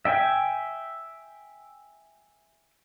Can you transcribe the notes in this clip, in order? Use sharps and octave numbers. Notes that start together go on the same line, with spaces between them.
E5 G5 G#5